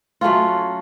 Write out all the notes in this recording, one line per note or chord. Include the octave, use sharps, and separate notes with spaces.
F#3 A3 C#4 F4